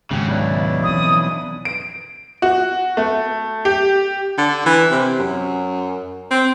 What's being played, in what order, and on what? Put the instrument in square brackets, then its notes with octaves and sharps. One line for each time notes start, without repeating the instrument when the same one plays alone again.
[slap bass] G#1 C#2 G#2 [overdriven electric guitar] C#3 F#3 [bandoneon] G4
[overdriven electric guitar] B1 [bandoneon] C#3 D4 E4
[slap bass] E3 F3 C4 [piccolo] D#6
[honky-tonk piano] D7
F#4
A3
G4
[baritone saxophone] D3
E3
C3
F#2
C4